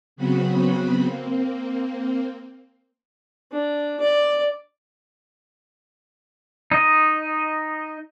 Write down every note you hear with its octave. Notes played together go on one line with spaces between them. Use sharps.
C#3 F#3 B3 C4 F#4 B5
A#3 C4
D4
D5
D#4 D#5